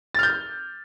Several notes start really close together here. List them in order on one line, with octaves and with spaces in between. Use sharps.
A6 F6 G6